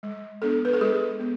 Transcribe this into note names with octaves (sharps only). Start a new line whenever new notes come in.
G#3
B3 D4 A4
B4
A4
G#3 G#4
B3